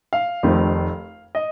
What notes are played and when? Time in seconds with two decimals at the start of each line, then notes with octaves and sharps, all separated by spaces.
0.13 F5
0.43 F1 F2 D#3 A3 C4
1.35 D#5